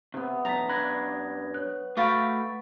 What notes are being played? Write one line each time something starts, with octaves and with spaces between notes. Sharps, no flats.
C3 B3 E5
B1 E2 A5 A#5 B6 F7
F#2 D4 B5 F#6 G#6 A#6
C#5 F#6
A3 F#4 F5 B5 C#6 A6 D7